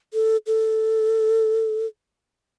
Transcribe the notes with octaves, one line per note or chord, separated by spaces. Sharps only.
A4
A4